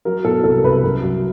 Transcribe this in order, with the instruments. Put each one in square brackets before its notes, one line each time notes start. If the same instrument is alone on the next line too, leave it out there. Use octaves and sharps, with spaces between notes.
[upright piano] F#3 A#4
B2 A4
C2 A4
A#4
C2 B4
F#2 A#4
F#3